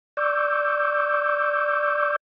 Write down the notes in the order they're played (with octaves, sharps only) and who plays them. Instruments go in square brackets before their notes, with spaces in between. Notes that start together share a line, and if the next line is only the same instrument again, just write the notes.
[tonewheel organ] D5 C#6 D6 E6 G6